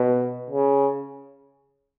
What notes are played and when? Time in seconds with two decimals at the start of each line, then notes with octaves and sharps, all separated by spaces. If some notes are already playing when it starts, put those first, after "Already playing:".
Already playing: B2
0.50 C#3